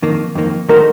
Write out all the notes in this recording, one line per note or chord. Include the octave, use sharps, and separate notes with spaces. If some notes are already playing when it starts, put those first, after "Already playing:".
F2 D#3 A#3
F2 D#3 A#3
D#3 A3 D#4 F#4 A#4 C5